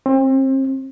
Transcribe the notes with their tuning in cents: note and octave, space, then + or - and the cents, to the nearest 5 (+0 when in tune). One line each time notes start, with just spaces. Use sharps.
C4 +35